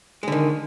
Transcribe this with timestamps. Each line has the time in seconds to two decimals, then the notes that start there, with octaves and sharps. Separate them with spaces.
0.23 G#3
0.28 D3
0.32 D#3